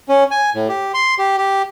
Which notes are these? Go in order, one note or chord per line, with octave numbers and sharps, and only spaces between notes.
C#4
G#5
A2
G4
C6
G4
G4